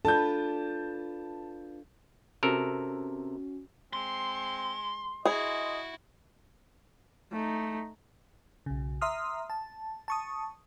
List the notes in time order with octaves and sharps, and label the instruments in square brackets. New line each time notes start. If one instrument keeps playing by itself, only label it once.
[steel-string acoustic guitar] D4 F4 B4 [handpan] A4 [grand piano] A5 G6
[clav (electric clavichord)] C3 A4 A#4 [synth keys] C#4 F#4
[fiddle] G#3 [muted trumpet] C4 [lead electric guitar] C6
[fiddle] E4 F#4 [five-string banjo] G#4 [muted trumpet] D#5
[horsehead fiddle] A3 D#4
[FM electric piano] B1 C#3
E5 A#5 C6 D#6 F6
A5
A5 C#6 D#6